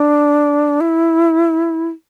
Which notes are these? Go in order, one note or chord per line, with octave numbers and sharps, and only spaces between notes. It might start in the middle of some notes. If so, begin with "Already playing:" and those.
Already playing: D4
E4